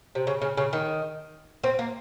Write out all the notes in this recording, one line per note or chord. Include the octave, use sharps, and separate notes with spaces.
C3
C#3
C#3
C#3
D#3
C4
A#3